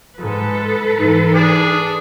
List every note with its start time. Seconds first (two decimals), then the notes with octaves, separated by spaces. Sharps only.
0.18 G#2 G#3 A4 B4
0.97 G#2 E3 D#4
1.35 D4 G#4